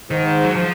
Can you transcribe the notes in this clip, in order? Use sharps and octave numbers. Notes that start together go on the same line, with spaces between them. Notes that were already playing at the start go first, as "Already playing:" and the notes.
G#2 D#3
F#3
F3